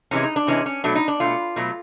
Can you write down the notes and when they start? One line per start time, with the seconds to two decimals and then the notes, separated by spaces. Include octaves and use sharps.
0.11 C3 E3 G#3 C#4
0.23 D#4
0.36 D4
0.47 C3 E3 G#3 C#4
0.66 C#4
0.84 B2 F#3 A3 D4
0.95 D#4
1.08 D4
1.20 B2 F#3 A3 F4
1.56 B2 F#3 A3